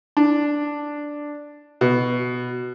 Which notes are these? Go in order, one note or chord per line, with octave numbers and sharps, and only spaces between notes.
D4
B2